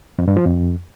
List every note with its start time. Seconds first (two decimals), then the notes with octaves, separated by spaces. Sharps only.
0.19 F2
0.28 G2
0.37 F3
0.46 F2